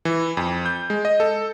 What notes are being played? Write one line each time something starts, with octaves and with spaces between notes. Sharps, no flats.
E3
F2
G6
G#3
D#5
A4